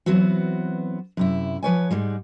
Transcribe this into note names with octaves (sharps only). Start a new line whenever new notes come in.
E3 F#3 B3 C4 F#4
F#2 C3 E4
F3 B4 C#5 G#5
G#2 G3 G#3